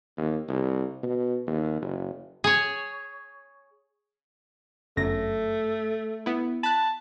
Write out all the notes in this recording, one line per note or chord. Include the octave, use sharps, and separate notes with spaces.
D#2
C2
B2
D#2
F#1
G#4 C#5
G1 F#2 A3 A#6
B3 E4
A5 B5 F#6